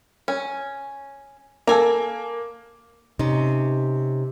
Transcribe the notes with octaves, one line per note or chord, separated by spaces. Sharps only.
C#4
A#3 A4 G#5 A#5
C3 C#4 D#4